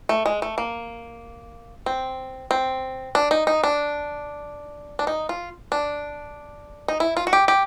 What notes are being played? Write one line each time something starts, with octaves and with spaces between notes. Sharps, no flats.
A3
G#3
A3
A#3
C4
C4
D4
D#4
D#4
D4
D4
D#4
F4
D4
D#4
E4
F4
F#4
G4
G4